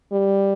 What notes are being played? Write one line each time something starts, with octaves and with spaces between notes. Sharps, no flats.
G3